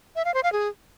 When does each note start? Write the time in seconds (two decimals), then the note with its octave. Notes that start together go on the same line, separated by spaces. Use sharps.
0.16 E5
0.25 F5
0.34 C5
0.43 F5
0.53 G#4